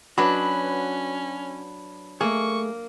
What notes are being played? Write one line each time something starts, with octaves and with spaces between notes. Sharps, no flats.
F#3 C#4 D4 F#4 B4 B5
A3 A#3 G#4 C#6